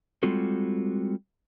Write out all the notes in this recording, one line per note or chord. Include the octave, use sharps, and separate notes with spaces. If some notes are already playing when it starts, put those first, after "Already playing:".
G3 G#3 C4 F4 F#4 A4